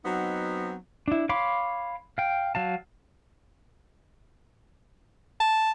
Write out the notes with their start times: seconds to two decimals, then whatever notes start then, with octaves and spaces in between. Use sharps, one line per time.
0.05 F#3 B3 C4 D#4
1.08 D4 E4
1.29 C#5 F5 B5 C6 D6
2.18 F5 G5
2.55 F#3 F5 A5
5.40 A5